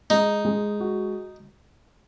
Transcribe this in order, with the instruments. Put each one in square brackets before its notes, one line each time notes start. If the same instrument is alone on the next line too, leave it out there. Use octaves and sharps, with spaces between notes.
[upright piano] G#3 [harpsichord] D#4
[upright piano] G#3
F#4